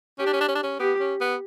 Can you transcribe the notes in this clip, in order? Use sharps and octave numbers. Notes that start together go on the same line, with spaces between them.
C#4 G4
D4
C#4
D4
C#4
D4
C#4
B3 G4
C#4
B3